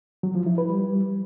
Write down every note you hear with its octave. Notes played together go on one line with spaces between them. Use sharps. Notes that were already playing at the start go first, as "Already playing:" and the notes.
F#3
F3
E4
B4
G3